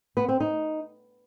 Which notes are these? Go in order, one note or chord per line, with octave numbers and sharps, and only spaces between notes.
B3
C4
D#4